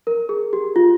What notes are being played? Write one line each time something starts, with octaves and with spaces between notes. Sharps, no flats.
A#4
G#4
G4
F4